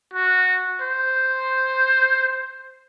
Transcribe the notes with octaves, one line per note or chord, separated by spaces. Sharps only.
F#4
C5